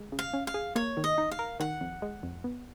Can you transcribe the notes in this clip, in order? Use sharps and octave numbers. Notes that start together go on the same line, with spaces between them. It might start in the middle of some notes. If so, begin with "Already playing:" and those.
Already playing: G#3
C#3
F5
C#4
F5
G#4
A#3 C#5
D#3
D#5
D#4
F5
A#4
D#3 F#5
F2
G#3
F2
B3